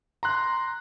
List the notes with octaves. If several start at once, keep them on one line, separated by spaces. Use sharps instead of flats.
A#5 C6 F#6